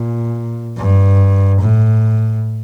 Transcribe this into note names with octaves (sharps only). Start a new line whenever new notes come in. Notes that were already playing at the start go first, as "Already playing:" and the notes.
Already playing: A#2
G2
A2